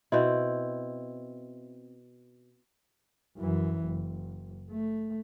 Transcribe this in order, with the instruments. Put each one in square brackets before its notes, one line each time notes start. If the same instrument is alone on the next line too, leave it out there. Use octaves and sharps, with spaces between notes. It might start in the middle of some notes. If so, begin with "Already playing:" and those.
[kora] B2 C4 E4
[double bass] F#2 E3
F#1
A3